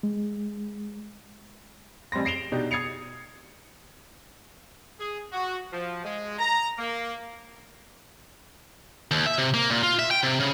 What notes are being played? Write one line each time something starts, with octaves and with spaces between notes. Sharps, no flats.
G#3
A1 G3 C4 C6 A#6
A#6 C7 D7 E7 F7 G7
B2 D4 D#4 G4
D#6 G#6 A6 C7 C#7 F7
G#4
F#4
F3
G#3
A#5
A#3
D#2
E5
C3
A#3
A#2
F4
E5
G5
C3
C#3